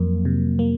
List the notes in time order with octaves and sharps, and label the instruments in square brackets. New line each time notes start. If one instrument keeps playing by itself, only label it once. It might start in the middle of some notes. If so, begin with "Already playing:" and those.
Already playing: [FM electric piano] F2 F#3 A#3
C3
A#3